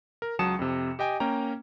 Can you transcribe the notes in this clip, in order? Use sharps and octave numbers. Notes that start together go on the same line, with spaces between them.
A#4
C#2 F#3 A5 D#6 C#7 E7
F2 C3
G4 D#5 G5 G#5
A#3 C#4 G5 A#5